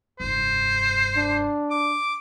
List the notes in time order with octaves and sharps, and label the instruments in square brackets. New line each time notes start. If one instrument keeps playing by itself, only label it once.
[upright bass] F1 G2 [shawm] C5
[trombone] D4
[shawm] D6